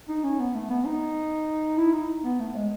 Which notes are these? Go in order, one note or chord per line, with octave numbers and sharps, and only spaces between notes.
D#4
C#4
B3
A3
B3
D#4
E4
D#4
B3
A3
G#3